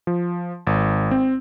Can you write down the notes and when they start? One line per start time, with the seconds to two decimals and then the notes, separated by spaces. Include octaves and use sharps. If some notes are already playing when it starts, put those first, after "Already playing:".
0.07 F3
0.67 G#1
1.11 C4